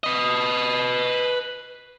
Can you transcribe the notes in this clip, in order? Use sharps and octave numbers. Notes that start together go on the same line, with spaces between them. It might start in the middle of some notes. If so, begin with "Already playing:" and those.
B4 D#5